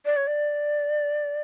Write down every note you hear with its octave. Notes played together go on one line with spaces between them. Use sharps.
D5
C#5
D5